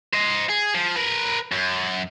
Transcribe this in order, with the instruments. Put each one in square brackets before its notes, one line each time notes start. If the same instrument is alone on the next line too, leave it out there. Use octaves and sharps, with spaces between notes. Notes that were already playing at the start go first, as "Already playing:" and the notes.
[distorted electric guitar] C5 D#5
G#4
F3
A#4 B4
F#2